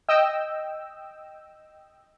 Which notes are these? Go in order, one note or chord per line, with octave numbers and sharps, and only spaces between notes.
D#5 G5 E6